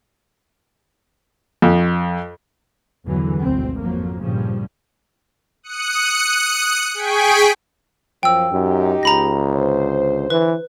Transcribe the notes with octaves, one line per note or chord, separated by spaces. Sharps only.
F2
G1 E2 D3 E3 F#3
G#1 D2 B2 C4
F2 F3 F#3 A#3
G2 A#2 C#3 F3 G3
D#6 F#6 C#7
G#4 G5 G#5 C#6 B6 D7
F#2 F3 G5 E6
F#2 D#4 G4
C#2 A#5 B5 A#6
D3 C5
E3 B4